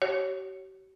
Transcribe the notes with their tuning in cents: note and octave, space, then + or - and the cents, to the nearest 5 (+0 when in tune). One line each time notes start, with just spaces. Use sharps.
G4 -45 C#5 +0